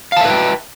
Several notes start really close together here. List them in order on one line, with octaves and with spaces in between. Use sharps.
F5 A5 E5 B4 G5